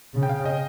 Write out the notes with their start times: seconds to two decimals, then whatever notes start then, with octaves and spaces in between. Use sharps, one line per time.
0.14 C#3
0.23 G5
0.29 F5
0.46 D#5